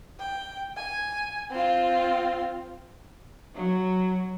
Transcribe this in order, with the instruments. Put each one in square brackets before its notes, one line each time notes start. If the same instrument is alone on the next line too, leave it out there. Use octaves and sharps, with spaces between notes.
[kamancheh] G5
G#5
C4 F4
[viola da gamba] F#3